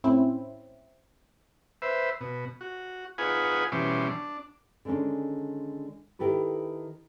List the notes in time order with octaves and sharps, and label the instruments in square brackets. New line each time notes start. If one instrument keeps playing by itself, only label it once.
[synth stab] A2 C4 C#4 E4
[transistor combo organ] B4 C5 E5
B2
F#4
D#4 F4 G#4 B4 F#5 G#5
B2 E3 G3 C#4 C6 D6
D4
[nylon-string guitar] D3 D#3 G#3 C#4 D4
D#3 E4 G4 A4 B4